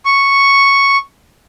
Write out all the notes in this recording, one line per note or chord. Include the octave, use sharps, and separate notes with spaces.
C#6